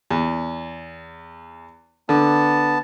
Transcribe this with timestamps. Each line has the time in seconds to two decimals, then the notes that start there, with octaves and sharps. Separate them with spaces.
0.10 E2
2.09 D3 B3 A5